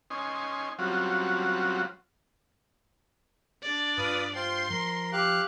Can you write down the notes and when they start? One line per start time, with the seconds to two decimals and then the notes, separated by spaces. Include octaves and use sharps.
0.10 C#4 D#4 G#5 C6
0.79 F#3 G3 C4 C#4 F4 F#4
3.62 D4 D5
3.98 G2 F4 B4 D#6
4.35 F4 C5 G5 C6
4.70 F3 A#4
5.12 G4 F5 F#6